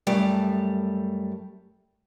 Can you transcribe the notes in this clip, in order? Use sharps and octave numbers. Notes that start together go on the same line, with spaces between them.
F#2 G3 A3